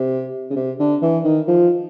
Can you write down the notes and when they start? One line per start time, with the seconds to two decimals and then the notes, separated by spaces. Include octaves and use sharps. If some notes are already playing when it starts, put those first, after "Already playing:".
Already playing: C3
0.50 C#3
0.56 C3
0.79 D3
1.02 E3
1.24 D#3
1.48 F3